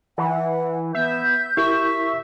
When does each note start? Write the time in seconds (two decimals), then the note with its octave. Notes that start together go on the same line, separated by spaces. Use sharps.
0.18 E3 F#5
0.95 B3 E5 G6
1.57 E4 G4 A#4 E5 C#6